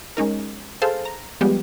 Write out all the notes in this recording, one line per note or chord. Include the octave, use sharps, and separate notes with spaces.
G#3 C#4 D#4 A#4
G#4 A4 C5 F5 A5
A#5
F3 G3 G#3 B3 G4